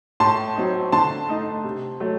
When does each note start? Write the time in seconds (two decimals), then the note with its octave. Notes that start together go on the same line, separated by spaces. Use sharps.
0.20 A2 A5 C6
0.56 F#3 C4 D#4
0.92 D3 A5 C6
1.29 A3 D#4
1.64 C3
2.00 F#3 A3